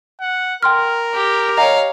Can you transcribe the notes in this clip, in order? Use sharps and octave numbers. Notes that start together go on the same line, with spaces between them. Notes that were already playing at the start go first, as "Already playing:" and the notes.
F#5
A#4 G5 C6 F6
G4
C#5 D#5 F5 G5 A#5